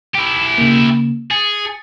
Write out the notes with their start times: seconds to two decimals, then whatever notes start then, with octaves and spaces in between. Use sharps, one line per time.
0.15 E4 G4
0.58 C#3 A#3
1.31 G#4 A6 C#7